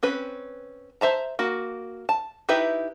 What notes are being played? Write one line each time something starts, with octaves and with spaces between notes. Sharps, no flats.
C4 C#4 B4
C5 E5 A5 A#5
A#3 F#4
A5
D#4 E4 G4 B4 E5